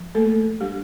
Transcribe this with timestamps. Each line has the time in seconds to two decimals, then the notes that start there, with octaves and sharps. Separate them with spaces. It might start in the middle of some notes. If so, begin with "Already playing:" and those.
Already playing: F3
0.15 A3 A#3 A4
0.61 G3 D4 G4